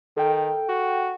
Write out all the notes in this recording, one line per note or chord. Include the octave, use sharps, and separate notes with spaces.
D#3 A4 G5
F#4